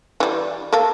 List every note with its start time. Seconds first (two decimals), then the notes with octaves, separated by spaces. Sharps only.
0.20 E3 G3
0.73 A#3 A4